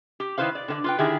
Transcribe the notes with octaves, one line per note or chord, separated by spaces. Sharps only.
G4
D#3 E4 B4 C5 F5
D5
D3 B3 D5
F4 B4 G5
D3 D#3 E4 G4 G#4